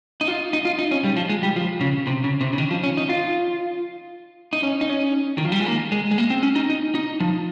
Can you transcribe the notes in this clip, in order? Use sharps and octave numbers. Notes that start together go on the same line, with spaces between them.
D#4
F4
D#4
F4
D#4
C#4
G3
F3
G#3
G3
F3
C#3
C3
C#3
C3
C#3
D#3
F3
C#4
D#4
F4
D#4
C#4
D#4
C#4
D#3
F3
G3
G#3
A#3
G#3
G#3
A#3
C4
C#4
D#4
D#4
D#4
F3